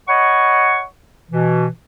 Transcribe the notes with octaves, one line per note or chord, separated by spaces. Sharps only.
C#5 D#5 F#5 B5 C#6
B2 E3